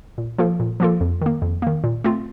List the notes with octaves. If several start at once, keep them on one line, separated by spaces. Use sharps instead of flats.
A#2
F3 A#3 F4 A4
A#2
F3 A#3 F4 A4
F2
D#3 A#3
F2
D#3 A#3
A#2
A3 C4 F4